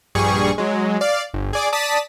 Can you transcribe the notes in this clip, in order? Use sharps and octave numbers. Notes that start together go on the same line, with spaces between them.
A#1 G2 G3 G#4 C#6
F#3 G#3
D5 F5
G1
G#4 D5 D6
D5 A5 D#6 A6 B6